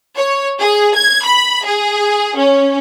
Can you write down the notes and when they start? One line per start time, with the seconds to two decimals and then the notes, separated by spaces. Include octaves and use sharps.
0.15 C#5
0.60 G#4
0.94 G#6
1.24 B5
1.65 G#4
2.37 C#4